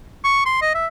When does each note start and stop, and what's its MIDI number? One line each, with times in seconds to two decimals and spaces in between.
0.24 0.44 85
0.46 0.60 84
0.62 0.73 75
0.75 0.87 76